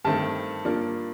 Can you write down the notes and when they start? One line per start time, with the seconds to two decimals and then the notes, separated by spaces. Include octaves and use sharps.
0.05 G2 D#3 A3 C4 A5
0.65 G2 F3 A#3 D4